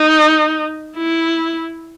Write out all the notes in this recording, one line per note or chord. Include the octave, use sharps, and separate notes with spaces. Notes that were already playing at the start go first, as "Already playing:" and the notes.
Already playing: D#4
E4